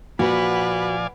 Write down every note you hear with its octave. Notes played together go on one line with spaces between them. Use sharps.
A#2 F3 F#4 B4 D5 F5 G#5 B5